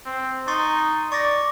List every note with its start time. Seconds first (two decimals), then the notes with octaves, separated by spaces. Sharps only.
0.06 C4
0.48 D#4 C6 C#6 A6
1.12 D5 C#6 A6 A#6